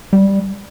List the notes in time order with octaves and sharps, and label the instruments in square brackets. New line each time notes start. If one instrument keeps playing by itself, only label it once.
[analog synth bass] G3